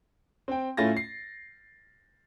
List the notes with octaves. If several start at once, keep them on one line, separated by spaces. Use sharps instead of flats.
C4 G5
A2 A3 C#4 F4 A6 A#6
C7